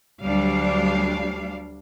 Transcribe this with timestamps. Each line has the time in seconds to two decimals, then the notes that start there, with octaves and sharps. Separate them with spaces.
0.22 D2 F#3 G3 D4 F5